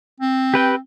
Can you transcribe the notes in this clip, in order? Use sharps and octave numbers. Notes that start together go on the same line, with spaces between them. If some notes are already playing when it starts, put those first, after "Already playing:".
C4
G4 B4 G5